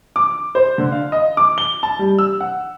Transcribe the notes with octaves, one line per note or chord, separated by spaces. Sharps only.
D6
C5
D3
F5
D#5
D6
G7
A5
G3
E6
F#5